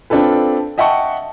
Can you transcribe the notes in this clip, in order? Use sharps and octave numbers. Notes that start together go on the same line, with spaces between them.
C4 D4 F4 A4 B4
D#5 E5 F#5 G5 A5 C#6